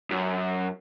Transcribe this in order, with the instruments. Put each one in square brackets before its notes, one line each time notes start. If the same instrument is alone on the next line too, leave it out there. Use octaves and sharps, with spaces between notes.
[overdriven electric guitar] F#2